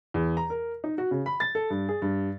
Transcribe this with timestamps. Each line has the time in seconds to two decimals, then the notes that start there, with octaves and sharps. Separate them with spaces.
0.14 E2
0.37 A#5
0.50 A#4
0.84 D#4
0.98 F#4
1.11 C#3
1.26 B5
1.40 A6
1.55 A4
1.70 G2
1.89 G#4
2.02 G2